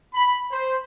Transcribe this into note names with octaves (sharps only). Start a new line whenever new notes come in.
B5
C5